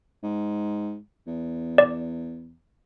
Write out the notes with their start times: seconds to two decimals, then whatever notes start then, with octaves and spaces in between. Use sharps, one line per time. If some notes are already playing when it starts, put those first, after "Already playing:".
0.23 G#2
1.27 E2
1.78 D5